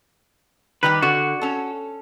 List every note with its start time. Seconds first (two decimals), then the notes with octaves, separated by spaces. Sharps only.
0.83 D#3 G3 G4 B4
1.02 D3 F#4
1.41 C#4 A4